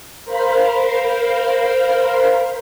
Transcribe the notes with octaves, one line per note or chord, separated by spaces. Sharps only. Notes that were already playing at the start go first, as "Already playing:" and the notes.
A#4 C5 F5 B5